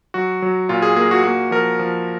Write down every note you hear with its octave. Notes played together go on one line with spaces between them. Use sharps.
F#3 F#4
F#3
A#2 F4
G#4
A#3 G#4
F#4
A#3 F#4
F3 A#4
F3